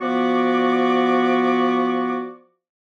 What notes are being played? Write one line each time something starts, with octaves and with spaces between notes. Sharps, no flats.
F3 B3 F#4 D5 C#6 D6